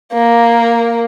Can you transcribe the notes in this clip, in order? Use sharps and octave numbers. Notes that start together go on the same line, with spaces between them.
A#3